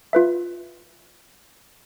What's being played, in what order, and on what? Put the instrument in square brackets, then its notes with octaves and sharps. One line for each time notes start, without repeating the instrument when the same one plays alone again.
[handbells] F4 B4 E5